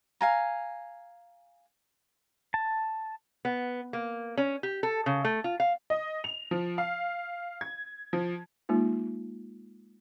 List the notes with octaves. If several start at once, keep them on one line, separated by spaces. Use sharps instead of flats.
F5 G#5 A#5
A5
B3
A#3
C#4
G4
A4
C#3
A3
F4
F5
D#5
F7
F3
F5
G#6
F3
G#3 A#3 D#4 F4